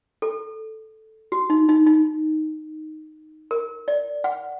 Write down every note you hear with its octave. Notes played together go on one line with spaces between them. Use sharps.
A4
F#4
D#4
D#4
D#4
A#4
D5
F#5